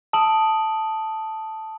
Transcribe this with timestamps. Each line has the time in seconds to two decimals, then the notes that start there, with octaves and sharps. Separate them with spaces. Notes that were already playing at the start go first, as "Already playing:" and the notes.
0.13 A5 D#6 E6 D7 F#7